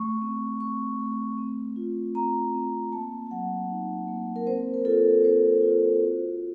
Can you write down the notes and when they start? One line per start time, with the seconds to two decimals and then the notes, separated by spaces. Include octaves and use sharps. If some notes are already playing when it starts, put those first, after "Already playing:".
Already playing: A3 C#6
0.22 C4
0.60 C4 C#6
0.99 A3
1.38 C4
1.76 F4
2.15 C4 A#5
2.54 C4
2.92 A#3 A5
3.27 A5
3.31 F#3 F#5
3.70 D#4
4.08 A#3
4.36 A#4
4.47 C4 C5
4.74 A#4
4.85 F4 A4
5.24 C4 C5
5.62 F4
6.01 F#4